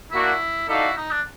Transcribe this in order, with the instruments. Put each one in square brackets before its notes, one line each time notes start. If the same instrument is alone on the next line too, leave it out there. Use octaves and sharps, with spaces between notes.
[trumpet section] A#3 D4 F#4 [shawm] E4
[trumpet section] D#4 F#4 A4 D5 F5 [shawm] E4
[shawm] D#4
D4